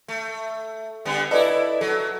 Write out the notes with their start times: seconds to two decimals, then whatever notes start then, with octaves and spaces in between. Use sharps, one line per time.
0.08 A3
1.05 D3 G3 B3
1.31 E4 A4 B4 D5 D#5
1.81 F#3 A4